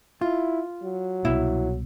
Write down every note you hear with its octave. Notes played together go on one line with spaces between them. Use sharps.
E4 F4
F#3
C2 B2 E4